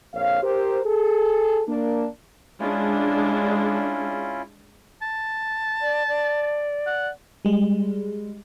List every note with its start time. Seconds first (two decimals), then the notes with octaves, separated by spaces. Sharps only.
0.14 A#1 F2 C#5 F5
0.43 G4 A#4 C5
0.85 G#4 A4
1.68 A#3 D4
2.60 G#3 C#4 D4 E4 F4
5.02 A5
5.81 D5
6.08 D5
6.86 F#5
7.45 G3 G#3